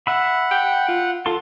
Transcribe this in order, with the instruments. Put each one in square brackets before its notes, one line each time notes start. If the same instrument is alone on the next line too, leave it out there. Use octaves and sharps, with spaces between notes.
[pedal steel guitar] E5 B5 [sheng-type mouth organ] F#5
[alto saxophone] G5
F4
[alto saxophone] F4 [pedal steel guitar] A4 C6